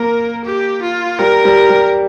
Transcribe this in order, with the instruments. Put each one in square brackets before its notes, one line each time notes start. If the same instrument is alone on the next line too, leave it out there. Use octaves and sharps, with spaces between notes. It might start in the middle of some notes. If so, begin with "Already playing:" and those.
Already playing: [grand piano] A#3 [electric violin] A#4
[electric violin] G4
F4
[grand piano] G3 [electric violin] A#4
[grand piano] G3
G3